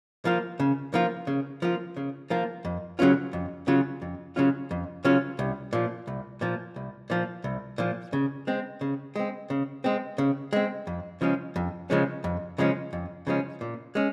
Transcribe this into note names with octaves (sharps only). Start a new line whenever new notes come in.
F3 A#3 F4
C#3
F3 A#3 F4
C#3
F3 A#3 F4
C#3
F3 A#3 F4
F2
C#3 F#3 C#4 F4
F2
C#3 F#3 C#4 F4
F2
C#3 F#3 C#4 F4
F2
C#3 F#3 C#4 F4
C2
A#2 F3
C2
A#2 F3
C2
A#2 F3
C2
A#2 F3
C#3
G#3 C4
C#3
G#3 C4
C#3
G#3 C4
C#3
G#3 C4
F2
C#3 F3 G#3 C#4
F2
C#3 F3 G#3 C#4
F2
C#3 F3 G#3 C#4
F2
C#3 F3 G#3 C#4
A#2
G#3 C#4